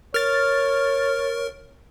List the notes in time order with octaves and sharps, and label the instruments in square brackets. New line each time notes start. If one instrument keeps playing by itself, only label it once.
[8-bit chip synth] A#4 [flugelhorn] C#5 [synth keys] F6 A6